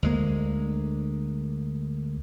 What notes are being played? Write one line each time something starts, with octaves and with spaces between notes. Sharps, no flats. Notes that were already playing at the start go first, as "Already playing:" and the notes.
D2 G#3 A#3